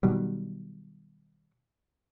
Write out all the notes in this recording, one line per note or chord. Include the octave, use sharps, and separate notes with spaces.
B2 D#3 F#3 G3